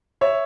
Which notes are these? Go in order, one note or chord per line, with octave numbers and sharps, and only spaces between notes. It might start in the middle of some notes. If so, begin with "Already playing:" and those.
C#5 E5